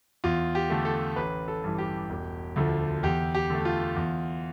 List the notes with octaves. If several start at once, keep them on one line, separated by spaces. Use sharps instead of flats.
E2 F4
G4
D3 A3
A4
A1 B4
A4
G2 E3
G4
E1
D2 D3 F3
E2 G4
G4
D3 A3
F4
E2